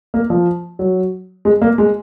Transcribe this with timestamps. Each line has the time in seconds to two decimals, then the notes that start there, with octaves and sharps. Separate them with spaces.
0.14 A#3
0.30 F3
0.79 F#3
1.45 G#3
1.62 A#3
1.78 G#3